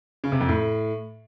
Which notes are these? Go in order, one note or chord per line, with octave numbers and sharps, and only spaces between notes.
C#3
C3
F2
A2